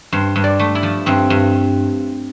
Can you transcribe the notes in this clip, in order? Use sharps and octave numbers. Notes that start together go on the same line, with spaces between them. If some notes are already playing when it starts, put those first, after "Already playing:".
G2 C5
G2
D5
A3
E4
F3
G2 C4
G2